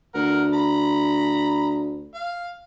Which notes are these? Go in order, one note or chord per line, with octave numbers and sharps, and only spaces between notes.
D2 A#4 F#5
A#5 B5
F5